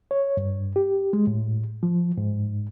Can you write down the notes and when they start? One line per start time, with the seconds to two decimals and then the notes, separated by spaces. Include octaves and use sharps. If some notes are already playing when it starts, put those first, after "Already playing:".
0.11 C#5
0.37 G2
0.76 G4
1.13 G#3
1.27 A2
1.83 F3
2.18 G#2